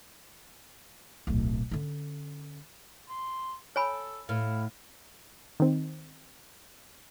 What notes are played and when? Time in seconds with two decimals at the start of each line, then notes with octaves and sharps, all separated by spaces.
1.27 D1 B1
1.71 D3 C#4
3.09 C6
3.76 A4 C#5 G#5 B5
4.29 A2 F5
5.60 D#3 C4